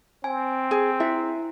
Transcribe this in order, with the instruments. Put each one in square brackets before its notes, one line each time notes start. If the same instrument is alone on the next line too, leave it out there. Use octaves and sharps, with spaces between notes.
[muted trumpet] C4 [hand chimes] G#5
[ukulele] G#4
[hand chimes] E4 [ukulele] E5